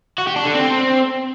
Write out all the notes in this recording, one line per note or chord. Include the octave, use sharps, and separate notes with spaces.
F#4
G4
D4
D3
C4